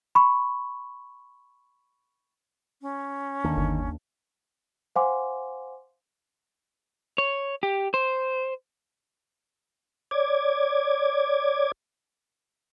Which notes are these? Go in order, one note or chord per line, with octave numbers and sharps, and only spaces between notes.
B5 C#6
C#4
D#2 D3 D#3 A#3 D4
G1
C5 F5 F#5 G#5 C6 D6
C#5
G4
C5
C#5 D5 D6 G#6